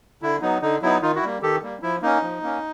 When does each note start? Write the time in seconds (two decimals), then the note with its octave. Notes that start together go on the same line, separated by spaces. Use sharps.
0.22 D3 E4
0.42 F#3 B3 D#4
0.62 D3 D#4
0.82 F#3 B3 D#4 E4
1.02 D#3 D#4 F4
1.15 E4 F#4
1.22 G3 A#3
1.42 D#3 G4 A4
1.62 G3 A#3
1.82 F3 E4
2.02 A#3 C#4 D#4
2.22 F3
2.43 A#3 C#4